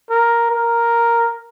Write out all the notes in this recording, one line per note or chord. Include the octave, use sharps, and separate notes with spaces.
A#4
A#4